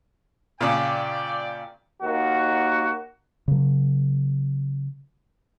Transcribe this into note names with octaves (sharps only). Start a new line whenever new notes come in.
A#2 C#3 D5 G5
D#2 D#3 A#3 F#4
C#3 F#3